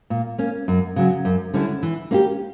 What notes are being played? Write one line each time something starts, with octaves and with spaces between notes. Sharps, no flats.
A#2
A#3 C#4
F#2
C#3 F#3 C#4
F#2
D3 G3 C#4 E4
E3
A#3 C#4 E4 G4